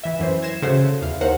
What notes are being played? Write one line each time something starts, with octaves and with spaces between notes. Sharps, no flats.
E3 E5
F#2 E3 C5
G#6 A#6 C7 E7
C#3 A3 F#4 C5
E2 F5
D#2 A#4 C5 F#5